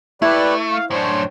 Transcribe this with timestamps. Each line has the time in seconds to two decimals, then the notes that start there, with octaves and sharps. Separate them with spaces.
0.22 A3 E4 G4 B4 D5
0.72 F5
0.91 F#2 A2 D4 C5 C#5